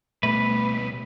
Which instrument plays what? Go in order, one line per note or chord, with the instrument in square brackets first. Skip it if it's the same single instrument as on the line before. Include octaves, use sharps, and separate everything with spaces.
[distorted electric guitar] B2 G3 [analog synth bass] A3 [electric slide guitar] B4